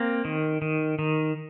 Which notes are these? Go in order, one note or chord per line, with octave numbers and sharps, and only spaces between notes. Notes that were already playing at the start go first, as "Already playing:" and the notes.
Already playing: A#3 C4
D#3
D#3
D#3